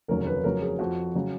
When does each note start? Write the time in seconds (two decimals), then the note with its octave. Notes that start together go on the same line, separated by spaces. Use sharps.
0.08 F1 D#2 C#3 F#3 A#4
0.27 B4
0.44 F2 C#3 F#3 A#4
0.61 G#4
0.79 F2 F3 F#4
1.15 C#3 F#3